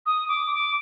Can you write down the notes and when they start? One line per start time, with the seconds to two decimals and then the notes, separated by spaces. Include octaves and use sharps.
0.06 D#6
0.29 D6
0.51 D6